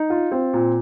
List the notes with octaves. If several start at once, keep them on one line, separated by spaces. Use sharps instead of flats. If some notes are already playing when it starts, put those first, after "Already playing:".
Already playing: D#4
F4
C4
A#2